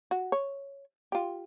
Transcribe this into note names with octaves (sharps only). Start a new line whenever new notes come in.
F#4
C#5
F4 G4